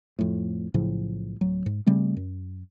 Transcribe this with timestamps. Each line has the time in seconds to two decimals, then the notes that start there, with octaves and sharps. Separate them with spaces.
0.19 F2 A2
0.74 B1 A2 C#3 F3
1.41 D1 F#3
1.66 G#2
1.87 C#3 G3 A3 C4
2.17 F#2